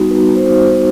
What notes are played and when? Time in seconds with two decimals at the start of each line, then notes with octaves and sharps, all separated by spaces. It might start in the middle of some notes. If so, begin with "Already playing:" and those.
Already playing: G3 B3 D#4 F#4
0.11 B4
0.35 C5